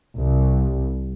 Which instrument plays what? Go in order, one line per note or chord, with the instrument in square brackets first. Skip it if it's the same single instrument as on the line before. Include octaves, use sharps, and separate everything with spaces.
[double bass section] C2